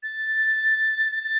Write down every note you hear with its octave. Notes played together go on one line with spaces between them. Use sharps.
A6
A6